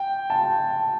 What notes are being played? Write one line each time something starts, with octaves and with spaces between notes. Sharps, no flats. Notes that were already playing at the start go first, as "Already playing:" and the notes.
Already playing: G5
A5